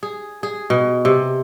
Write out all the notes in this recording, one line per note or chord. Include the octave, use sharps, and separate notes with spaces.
G#4
G#4
B2
C3